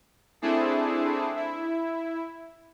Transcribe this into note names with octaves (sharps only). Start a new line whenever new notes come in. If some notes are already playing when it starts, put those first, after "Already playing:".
A3 C4 D4 E4 G#4 A4
E4